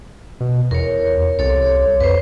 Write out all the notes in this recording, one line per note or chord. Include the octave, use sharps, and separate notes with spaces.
B2
E2 A#4 C#5
C2 A4 C#5
F2 B4 C5